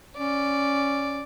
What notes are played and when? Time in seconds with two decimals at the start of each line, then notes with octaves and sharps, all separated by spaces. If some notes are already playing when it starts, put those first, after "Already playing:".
0.17 C#4 D5